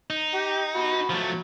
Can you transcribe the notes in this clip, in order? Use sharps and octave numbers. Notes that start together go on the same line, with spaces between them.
D#4
G4 G5
F#4 B5
F3 F#3 A3